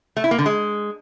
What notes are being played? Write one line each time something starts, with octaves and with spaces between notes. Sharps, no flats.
A3
E4
A#3
D3
G#3